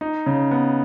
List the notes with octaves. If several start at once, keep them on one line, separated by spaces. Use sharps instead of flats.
D#4
C#3
B3